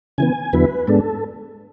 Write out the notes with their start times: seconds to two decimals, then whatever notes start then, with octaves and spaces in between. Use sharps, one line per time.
0.18 C#3 E3 B3 G#5
0.53 E2 D3 F#3 B3 E4 B4
0.87 G#2 G#3 B3 D4 A4